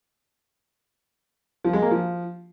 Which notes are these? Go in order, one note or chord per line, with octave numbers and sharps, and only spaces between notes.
F3
G#3
A#3
F3